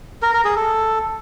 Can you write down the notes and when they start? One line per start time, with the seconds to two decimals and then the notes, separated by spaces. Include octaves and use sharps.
0.22 A#4
0.34 A#4
0.45 G#4
0.56 A4